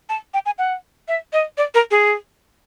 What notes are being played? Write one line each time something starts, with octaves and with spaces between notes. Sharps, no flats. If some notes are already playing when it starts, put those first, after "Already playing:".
A5
G5
G#5
F#5
E5
D#5
D5
A#4
G#4